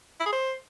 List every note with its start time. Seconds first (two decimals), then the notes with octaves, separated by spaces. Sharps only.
0.20 E4
0.26 G#4
0.32 C5